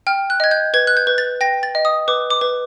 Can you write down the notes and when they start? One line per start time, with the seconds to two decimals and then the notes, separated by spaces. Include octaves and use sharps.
0.07 G5 F6
0.30 F#6
0.40 D#5 G#6
0.51 G6
0.74 B4 G#6
0.87 F#6
0.97 G6
1.07 B4
1.18 A6
1.41 G5 A#6
1.63 A6
1.75 D#5
1.85 D#6
2.08 B4 D6
2.30 D6
2.41 B4